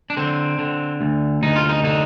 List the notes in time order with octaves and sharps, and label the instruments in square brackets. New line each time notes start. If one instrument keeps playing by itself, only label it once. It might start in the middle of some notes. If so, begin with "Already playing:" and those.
[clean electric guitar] D4
D3 C4
D3
D2
D2 D#4
F4
D#4
D3 D#4